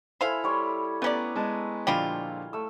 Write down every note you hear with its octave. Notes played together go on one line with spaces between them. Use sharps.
E4 A4 C5 E5 F5 G#5 B5
G3 C#5 C6
A3 B3 C#4 D5 G#5 A#5
G#3 B3 A5
A#2 D3 F3 G3 G#3 F4
A3 E6